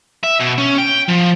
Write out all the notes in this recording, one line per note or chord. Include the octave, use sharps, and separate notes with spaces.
E5
B2
C#4
G5
F3